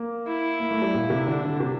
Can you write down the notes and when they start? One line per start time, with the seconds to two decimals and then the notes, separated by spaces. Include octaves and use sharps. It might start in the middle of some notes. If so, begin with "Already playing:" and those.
Already playing: A#3
0.27 E4
0.60 A#3
0.71 A3
0.82 G3
0.94 A#2
1.10 C3
1.27 D3 D4
1.44 D3
1.60 C3